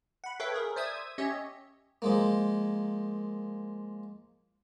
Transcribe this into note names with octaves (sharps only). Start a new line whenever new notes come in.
F#5 B5
A4 B4 C#5 E5 F5 G5
G#4 A#4
C5 D5 E5 D#6 E6 G#6
C#4 G4 C#5 D#5 E5
F3 G#3 A#3